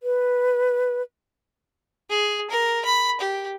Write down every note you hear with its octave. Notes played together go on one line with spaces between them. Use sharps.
B4
G#4
A#4
B5
G4